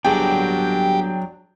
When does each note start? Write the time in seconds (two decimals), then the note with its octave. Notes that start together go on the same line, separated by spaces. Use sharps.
0.05 G1 F#3 D4 G4 G#4 G5